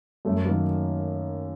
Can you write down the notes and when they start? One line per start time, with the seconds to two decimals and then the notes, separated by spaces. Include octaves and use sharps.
0.25 F#2 A3
0.45 D#3 F#3 A#3